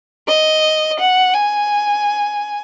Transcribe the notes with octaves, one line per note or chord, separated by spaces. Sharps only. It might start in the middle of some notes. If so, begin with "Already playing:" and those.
D#5
F#5
G#5